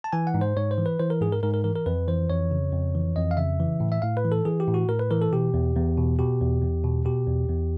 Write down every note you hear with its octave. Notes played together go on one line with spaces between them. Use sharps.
A5
E3 G#5
F#5
G#2
C5
G#2 C#5
C5
E3
B4
E3 C5
A#4
G#2 G#4
A#4
G#2 A#4
A#4
E3 A#4
A#4
F2 B4
E3 C5
F2 C#5
C#3
F2
E3
F2 D#5
F5
C#3 E5
E3
A2
E5
A2 F5
B4
E3
A4
E3 G#4
G4
A2
F#4
A2 A#4
B4
E3 A#4
A4
B2 G4
E2
E2
B2
B2 G4
E2
E2
B2
B2 G4
E2
E2